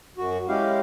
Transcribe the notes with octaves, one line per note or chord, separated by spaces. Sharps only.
F#2 F#4
G#3 C#4 E4 G4 F5